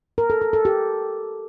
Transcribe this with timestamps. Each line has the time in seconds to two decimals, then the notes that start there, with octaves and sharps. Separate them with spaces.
0.18 A#4
0.30 A4
0.41 A4
0.53 A4
0.65 G4